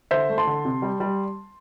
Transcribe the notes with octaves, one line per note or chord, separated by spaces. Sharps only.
D3 C5 E5
A3
A5 C6
D3
C3
G3
G3